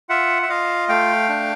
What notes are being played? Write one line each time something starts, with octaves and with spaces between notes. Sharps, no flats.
F4 E5 F#5
E5
F4 D#5 F5
A3 F5 G5
D4